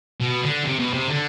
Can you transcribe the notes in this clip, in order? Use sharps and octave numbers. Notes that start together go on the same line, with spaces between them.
B2
D3
C3
B2
C3
D3